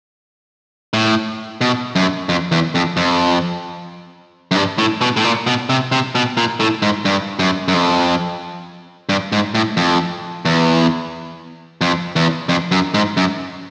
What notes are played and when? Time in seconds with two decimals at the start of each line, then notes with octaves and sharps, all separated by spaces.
0.93 A2
1.61 B2
1.96 F#2
2.29 F2
2.52 E2
2.75 F2
2.97 F2
4.51 F#2
4.56 G2
4.78 A2
5.01 B2
5.17 A2
5.24 A#2
5.47 B2
5.70 C3
5.92 C3
6.15 B2
6.37 A#2
6.60 A2
6.82 G#2
7.05 G2
7.39 F#2
7.68 F#2
7.74 F2
9.09 G2
9.32 G#2
9.55 A2
9.77 F2
10.45 E2
11.81 F2
12.16 E2
12.49 F2
12.71 F#2
12.94 G#2
13.17 F#2